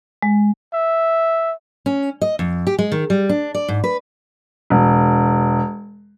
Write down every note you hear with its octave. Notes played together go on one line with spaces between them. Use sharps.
G#3
E5
C#4
D#5
F2
G4
G#3
D#3
G3
D4
D5
G#2
B4
E1